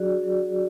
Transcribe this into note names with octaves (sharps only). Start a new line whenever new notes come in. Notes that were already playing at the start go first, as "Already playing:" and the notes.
Already playing: F#3 D4 F#4 G#4 D5
F#3